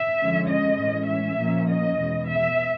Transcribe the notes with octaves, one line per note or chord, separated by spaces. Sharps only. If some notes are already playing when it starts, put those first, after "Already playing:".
Already playing: E5
F2 D3 F3 G#3 C#4
D#5
A2 E3 G#3 C#4
E5
A#2 F3 A#3 C#4
D#5
E2 B2 G#3
E5